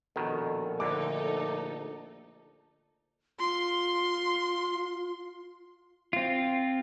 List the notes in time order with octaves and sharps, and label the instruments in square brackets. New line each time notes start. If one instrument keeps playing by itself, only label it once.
[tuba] A#1 [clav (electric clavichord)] B2 D#3 [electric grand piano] A4
[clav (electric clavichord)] D2 D3 [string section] D#4 A4 [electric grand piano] D6
[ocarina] F4 [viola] C6
[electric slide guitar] C4 F4